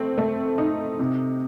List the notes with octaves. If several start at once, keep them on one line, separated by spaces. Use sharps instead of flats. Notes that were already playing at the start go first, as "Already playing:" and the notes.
Already playing: A3 C4
A3
D#4
C3